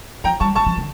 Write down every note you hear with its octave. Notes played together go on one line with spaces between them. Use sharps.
F3 G5 A#5
G3 A5 C#6
G3 A5 C#6
F3
D3